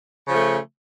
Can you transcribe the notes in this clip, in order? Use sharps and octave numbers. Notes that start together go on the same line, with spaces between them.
C#3 F3 A3